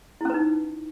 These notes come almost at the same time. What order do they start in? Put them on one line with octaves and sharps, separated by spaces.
E4 C#4 B4 D#4